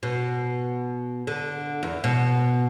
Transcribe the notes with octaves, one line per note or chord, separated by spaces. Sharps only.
B2
D3
E2
B2